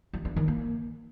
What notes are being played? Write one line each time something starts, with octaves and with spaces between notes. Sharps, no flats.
G3
D4
D#3
A#3